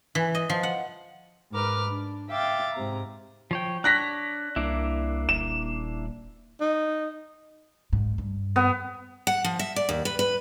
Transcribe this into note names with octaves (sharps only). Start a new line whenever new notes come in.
E3
D#5
F3
F#5
G#2 A#4 B4 D6 F6
D4
E5 F5 G5 D6 A6
G#2 C3 A#5
F3 C#5 G5
D4 C#5 F#6 A#6 B6
C2 A#3 D4 E4
D#1 E7
D#4
G#2
G2
B3
F#5
F3
E5
D5
D#2
B4
B4